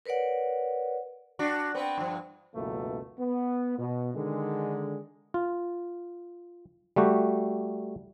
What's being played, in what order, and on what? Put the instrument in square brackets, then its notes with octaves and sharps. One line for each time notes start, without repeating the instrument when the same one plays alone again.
[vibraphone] A#4 B4 C#5 D5 F#5
[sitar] D4 F#4
B3 C4 B4
G2 F3
[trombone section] C#2 F#2 B2 E3 A3 A#3
B3
B2
D3 D#3 G#3
[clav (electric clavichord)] F4
G3 A3 F#4 G4